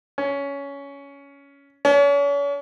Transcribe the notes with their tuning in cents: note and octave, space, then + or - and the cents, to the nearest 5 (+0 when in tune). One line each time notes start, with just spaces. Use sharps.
C#4 +15
C#4 +40